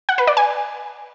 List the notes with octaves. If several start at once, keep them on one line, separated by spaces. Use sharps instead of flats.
F#5
B4
D5
G#5